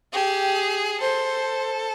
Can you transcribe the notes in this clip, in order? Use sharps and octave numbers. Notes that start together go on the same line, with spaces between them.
G4 G#4
A4 C5